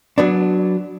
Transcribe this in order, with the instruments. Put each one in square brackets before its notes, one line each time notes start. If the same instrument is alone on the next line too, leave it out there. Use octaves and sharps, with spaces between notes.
[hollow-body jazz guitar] F#3 B3 D4